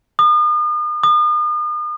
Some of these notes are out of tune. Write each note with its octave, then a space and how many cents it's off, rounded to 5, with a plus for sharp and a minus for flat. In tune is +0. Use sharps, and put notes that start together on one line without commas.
D#6 -40
D#6 -40